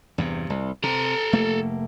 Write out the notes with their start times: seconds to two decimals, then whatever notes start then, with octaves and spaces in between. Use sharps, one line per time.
0.18 E2 G2 C3
0.50 C2
0.84 C3 A4 A#5
1.33 F1 A3 A#3